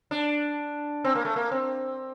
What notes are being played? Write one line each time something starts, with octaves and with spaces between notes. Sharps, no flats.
D4
C4
A#3
A3
A#3
C4